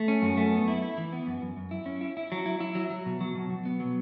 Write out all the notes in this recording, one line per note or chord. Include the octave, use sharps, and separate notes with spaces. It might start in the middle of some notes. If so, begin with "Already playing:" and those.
Already playing: A3
C#4
F#2
A3
B3
E4
E4
E3
B3
F#2
F#2
F#2
E4
C#4
E4
E4
F#3
E4
E4
F#3
F#3
B2
F#3
B2
B2
B3
F#3